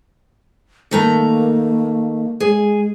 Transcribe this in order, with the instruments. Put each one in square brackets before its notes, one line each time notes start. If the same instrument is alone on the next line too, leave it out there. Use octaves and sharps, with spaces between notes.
[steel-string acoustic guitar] D#3 A3 A#5 [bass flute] A#3
[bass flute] G#3 [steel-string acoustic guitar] G#4